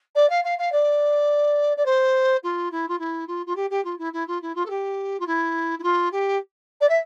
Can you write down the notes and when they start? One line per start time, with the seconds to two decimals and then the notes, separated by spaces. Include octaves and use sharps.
0.15 D5
0.29 F5
0.44 F5
0.58 F5
0.72 D5
1.76 D5
1.85 C5
2.43 F4
2.71 E4
2.88 F4
2.99 E4
3.27 F4
3.46 F4
3.55 G4
3.70 G4
3.84 F4
3.98 E4
4.13 E4
4.27 F4
4.41 E4
4.55 F4
4.65 A4
4.70 G4
5.19 F4
5.26 E4
5.79 E4
5.83 F4
6.12 G4
6.80 D5
6.89 E5